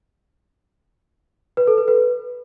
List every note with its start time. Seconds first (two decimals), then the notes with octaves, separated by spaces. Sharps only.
1.57 B4
1.67 A4
1.78 B4
1.88 B4